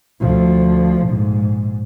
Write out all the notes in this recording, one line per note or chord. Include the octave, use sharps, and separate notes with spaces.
D2 F3
A#1 G#2